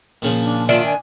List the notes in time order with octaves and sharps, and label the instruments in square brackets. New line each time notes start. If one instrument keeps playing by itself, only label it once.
[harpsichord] A#2 C#3 F3
[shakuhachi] D4
[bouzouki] D#3 D4 E5 [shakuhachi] F4
[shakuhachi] G#5